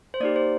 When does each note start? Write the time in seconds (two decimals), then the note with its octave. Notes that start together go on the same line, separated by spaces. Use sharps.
0.14 C5
0.20 A#3 D#4 G4 D5
0.36 C5